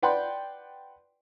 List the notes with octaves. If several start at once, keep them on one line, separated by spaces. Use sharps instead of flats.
B4 D5 F#5 G5 B5 C6